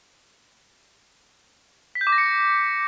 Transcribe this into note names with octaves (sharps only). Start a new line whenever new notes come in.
B6
G6
D6
A#6
C#7